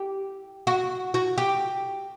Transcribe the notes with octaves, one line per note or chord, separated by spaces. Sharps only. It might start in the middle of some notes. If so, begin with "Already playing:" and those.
Already playing: G4
F#4
F#4
G4